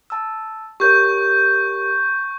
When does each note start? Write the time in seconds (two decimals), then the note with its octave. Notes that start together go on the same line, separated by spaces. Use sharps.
0.10 A5 E6
0.80 G4 A#4 C#5 C#6 G6